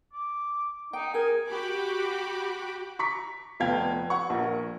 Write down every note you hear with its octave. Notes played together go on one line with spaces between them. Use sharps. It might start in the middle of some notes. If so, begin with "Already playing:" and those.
D6
D#4 G5
G#4 A#4 G#5
F#4 G4 B5 D6
A#5 C#6 D6 B6
F1 F2 B3 F5 G5 G#6
F#5 C#6
A#1 A#4